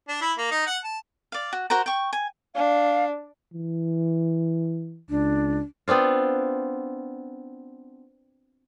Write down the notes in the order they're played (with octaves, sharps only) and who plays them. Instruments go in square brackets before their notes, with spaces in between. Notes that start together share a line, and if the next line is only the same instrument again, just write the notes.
[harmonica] D4
E4
A#3
D#4
F#5
A5
[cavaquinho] D5 F5
F#4
F#4 A#4 C5 A#5
G5 C#6
G#5
[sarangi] D4 [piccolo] F5
[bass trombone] E3
[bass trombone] C#2 [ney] D4
[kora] B3 C4 D4 F4